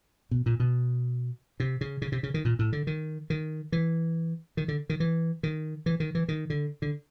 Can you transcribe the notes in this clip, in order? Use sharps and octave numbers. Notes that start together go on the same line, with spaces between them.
B2
A#2
B2
C3
C#3
C#3
C3
C#3
D#3
A#2
A2
D3
D#3
D#3
E3
D#3
D3
D#3
E3
D#3
E3
D#3
E3
D#3
D3
D3